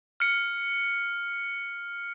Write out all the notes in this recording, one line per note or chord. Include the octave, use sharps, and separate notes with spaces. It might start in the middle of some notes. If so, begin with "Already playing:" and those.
F6 C#7